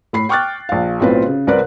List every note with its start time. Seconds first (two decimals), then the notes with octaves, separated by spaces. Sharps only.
0.13 A2 B5 C7
0.29 G5 C#6 D6 F6 F#6 A6
0.69 A#1 F5
1.00 B1 A2 C4 F4 B4
1.26 C#3
1.47 C2 C4 A#4 B4 D5 F#6